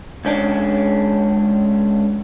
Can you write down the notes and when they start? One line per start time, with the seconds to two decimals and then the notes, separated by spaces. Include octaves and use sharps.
0.25 C#2 C#4 D4